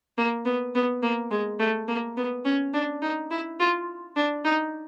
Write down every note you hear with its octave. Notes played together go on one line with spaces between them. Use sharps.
A#3
B3
B3
A#3
G#3
A3
A#3
B3
C#4
D4
D#4
E4
F4
D4
D#4